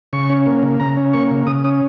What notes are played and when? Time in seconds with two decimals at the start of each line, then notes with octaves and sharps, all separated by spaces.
0.13 C#3 C#6
0.30 C#4
0.46 A#3
0.63 C#3
0.80 C#3 A#5
0.97 C#4
1.13 A#3 C#6
1.31 C#3
1.47 C#3 D#6
1.64 C#4 D#6